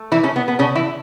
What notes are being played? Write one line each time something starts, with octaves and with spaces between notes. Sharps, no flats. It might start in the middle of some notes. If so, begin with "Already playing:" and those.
Already playing: A3
E3 E4
C#3 C#4
B3
B3
C#3 C#4
E3 E4